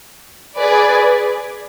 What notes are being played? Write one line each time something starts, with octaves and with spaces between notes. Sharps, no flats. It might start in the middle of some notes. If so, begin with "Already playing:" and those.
G#4 B4 D5